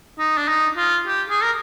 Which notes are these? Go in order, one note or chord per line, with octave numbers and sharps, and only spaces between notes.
D#4
D4
D#4
F4
G4
G#4
A#4